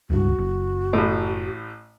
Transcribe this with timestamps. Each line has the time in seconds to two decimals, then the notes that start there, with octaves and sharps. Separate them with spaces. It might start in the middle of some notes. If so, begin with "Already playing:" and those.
0.10 D1 C#2 G2 F#4
0.38 F#1
0.93 A1 A2